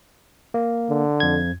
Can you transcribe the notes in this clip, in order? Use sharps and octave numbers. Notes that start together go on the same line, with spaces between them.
A#3
D3
F2 G#6